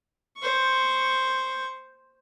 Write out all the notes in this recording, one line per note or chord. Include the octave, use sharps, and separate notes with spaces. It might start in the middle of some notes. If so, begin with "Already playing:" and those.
C5 C#6